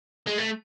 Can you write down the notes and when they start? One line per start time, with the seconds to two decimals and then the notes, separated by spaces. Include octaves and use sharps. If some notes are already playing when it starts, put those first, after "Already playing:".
0.27 G#3
0.38 A3